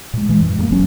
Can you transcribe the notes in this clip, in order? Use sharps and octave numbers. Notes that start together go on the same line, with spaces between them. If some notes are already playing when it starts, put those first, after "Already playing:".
A#2 G#3
E3 G#3
F#2
G2 A#3
F#1 F#3 C#4